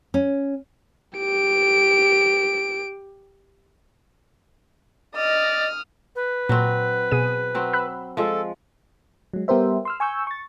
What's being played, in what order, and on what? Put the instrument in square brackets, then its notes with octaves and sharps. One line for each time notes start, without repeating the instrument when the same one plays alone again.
[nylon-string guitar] C#4
[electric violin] G4 D7
[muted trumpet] D5 [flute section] D#5 [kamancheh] D#6 F6
[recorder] B4
[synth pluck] A#2 [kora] F#3 C4
[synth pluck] B2 G#4 D#7
[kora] F#3 C4
[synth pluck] B5 E6 F#6
[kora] F3 G#3 [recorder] A4
[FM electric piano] F#3 G#3
G3 B3 G4 A#4 C5 E5
C6 E6 F6
G#5 C#6 E6 G6
C#6 A6